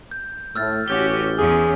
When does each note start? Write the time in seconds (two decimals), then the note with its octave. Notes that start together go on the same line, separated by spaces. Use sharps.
0.11 G6
0.56 A2 E6 F6 A6
0.88 A1 C#4 F#4 G4 D6 G6 G7
1.38 E2 C#4 G#4